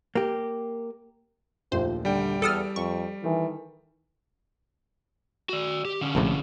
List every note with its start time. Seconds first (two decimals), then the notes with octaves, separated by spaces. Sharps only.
0.15 A#3 G4
1.72 A#1 D#2 A3 F4 C5
2.05 D3 G3 G5
2.42 E2 A4 D#6 F6 D7
2.76 F2 C#6
3.24 D#3 E3 A4
5.49 F#4 D5
5.85 G4
6.01 D3 C#4
6.15 A#1 A2 C3